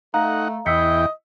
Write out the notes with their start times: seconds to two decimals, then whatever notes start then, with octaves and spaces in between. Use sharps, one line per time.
0.14 A3 D#4 F5 F#5 A#5
0.66 E2 E4 D#5 G5 E6 B6 C#7